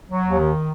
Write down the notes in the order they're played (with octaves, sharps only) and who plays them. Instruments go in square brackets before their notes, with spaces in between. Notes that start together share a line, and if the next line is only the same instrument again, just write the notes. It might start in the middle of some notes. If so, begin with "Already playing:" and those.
[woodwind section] F#3
D#2
D#3